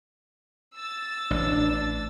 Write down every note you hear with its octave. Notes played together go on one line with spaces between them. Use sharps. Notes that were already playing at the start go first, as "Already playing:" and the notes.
E6 A6
A1 D4